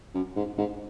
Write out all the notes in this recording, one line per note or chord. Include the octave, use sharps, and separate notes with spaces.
F#2
G#2
G#2